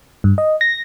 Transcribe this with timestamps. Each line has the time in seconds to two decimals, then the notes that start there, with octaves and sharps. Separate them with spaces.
0.24 G2
0.38 D#5
0.61 A#6